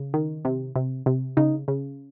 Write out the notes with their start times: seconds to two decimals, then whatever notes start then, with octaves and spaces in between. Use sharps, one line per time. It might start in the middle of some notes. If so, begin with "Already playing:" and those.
Already playing: C#3
0.14 D#3
0.45 C3
0.76 C3
1.06 C3
1.37 C#3 D#4
1.68 C#3